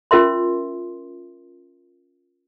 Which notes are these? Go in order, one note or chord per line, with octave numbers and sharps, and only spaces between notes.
C#4 F4 A#4 E5 C6